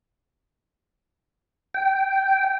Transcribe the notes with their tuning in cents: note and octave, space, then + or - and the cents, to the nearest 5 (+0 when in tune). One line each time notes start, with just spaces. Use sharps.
G5 -10